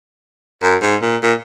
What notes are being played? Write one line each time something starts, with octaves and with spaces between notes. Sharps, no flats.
F#2
G#2
A#2
A#2